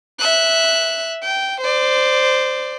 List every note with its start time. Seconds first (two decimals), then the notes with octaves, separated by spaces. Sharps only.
0.19 E5 F#6
1.23 G5
1.61 C5 D5